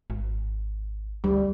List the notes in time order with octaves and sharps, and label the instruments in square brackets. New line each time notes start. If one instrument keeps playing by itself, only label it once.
[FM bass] G#1
[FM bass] D2 [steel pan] G3